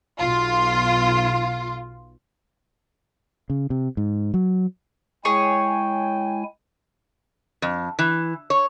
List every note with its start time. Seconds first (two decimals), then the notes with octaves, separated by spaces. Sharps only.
0.19 B1 F4
3.50 C#3
3.70 C3
3.97 G#2
4.34 F#3
5.25 G#3 E4 G#4 C#5 G5 G#5 C#6
7.62 F2
7.99 E3
8.50 C#5